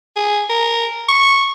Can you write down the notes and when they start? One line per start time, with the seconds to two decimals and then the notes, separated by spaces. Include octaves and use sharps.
0.16 G#4
0.50 A#4
1.09 C#6